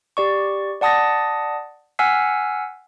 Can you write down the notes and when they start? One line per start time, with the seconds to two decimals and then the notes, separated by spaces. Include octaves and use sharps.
0.17 G4 D5 C#6
0.81 D5 F#5 A5 D#6 A6 A#6
1.99 F#5 G#5 E6 F6 B6 C7